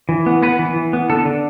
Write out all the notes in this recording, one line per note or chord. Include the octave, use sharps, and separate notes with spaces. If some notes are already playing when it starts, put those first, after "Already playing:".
E3
B3
B3 B4
E3
E3
B3
D3 A4
D3